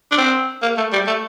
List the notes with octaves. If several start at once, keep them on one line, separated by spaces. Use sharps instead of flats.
D4
C4
A#3
A3
G3
A3